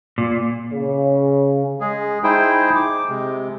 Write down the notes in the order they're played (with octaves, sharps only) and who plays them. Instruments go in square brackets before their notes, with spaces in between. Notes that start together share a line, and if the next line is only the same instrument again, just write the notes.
[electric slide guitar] A#2
[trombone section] C#3
[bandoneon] G#3 G#4
D#4 E4 G#4 C5 G5
D6
C3 G#3